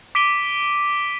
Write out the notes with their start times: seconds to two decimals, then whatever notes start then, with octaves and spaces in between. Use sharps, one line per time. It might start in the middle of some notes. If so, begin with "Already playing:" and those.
0.15 D6 B6 D7 D#7 G7